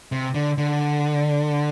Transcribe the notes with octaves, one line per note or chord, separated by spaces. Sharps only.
C3
D3
D3